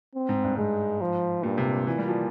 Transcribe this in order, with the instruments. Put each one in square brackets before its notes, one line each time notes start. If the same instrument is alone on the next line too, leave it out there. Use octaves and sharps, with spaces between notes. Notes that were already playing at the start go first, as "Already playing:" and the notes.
[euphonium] C4
[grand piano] G#2
G2
[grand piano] G#2 [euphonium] G#3
[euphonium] F3
[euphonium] G2 [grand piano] A#2
[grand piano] C3
[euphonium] A#2 [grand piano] E3
[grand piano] G3
F3